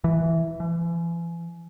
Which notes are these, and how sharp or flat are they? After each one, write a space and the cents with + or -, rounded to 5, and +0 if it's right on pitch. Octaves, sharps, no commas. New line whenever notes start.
E3 -5
E3 +40